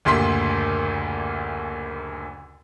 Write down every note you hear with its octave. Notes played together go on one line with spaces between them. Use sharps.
F#1 D2 A#2 G4 C6 B6